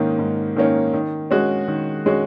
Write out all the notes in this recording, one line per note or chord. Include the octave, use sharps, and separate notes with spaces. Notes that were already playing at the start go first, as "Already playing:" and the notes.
Already playing: G#2 D#3 A#3 C#4
G#2
D#3 A#3 C#4
D#3
G#3 C#4 F#4
D#3
G#3 C#4 F#4